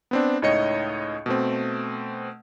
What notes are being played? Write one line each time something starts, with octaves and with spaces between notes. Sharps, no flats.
B3 C4 D4
C#2 A2 D#4 C#5 D#5 C#7
B2 A3 C4